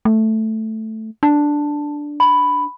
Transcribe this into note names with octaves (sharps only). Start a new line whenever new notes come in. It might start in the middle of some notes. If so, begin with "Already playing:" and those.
A3
D4 A5
B5